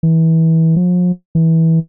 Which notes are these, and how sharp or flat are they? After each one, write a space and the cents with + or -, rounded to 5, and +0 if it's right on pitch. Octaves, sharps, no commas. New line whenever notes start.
E3 -25
F3 +40
E3 -20